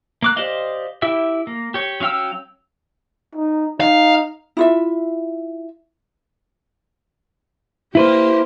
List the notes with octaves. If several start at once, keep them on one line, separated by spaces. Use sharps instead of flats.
A#3 D6 F#6
G4 C5 D5 D#5 F5
E4 G4 E5
A#3
G4 C#5
F#3 C#4 F5 G5 E6
D#4
D#4 F5
E4 F4 E5
A#3 E4 G4 B4 C5